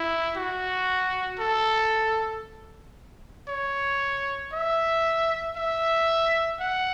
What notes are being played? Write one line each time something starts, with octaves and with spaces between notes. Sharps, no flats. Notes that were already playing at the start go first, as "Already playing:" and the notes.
Already playing: E4
F#4
A4
C#5
E5
E5
F#5